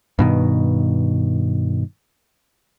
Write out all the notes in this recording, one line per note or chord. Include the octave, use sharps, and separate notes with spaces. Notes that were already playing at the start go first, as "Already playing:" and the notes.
G2 B2 D#3